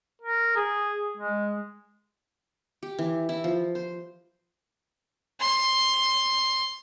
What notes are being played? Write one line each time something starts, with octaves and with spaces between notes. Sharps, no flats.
A#4
G#4
G#3
G4
E3
E4
F3
C5
C6